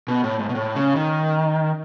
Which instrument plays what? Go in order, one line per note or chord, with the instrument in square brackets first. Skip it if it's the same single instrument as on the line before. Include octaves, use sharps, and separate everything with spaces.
[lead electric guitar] B2
A2
G#2
B2
A2
C#3
D#3